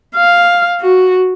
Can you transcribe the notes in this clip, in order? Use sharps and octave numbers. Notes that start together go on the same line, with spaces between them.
F5
F#4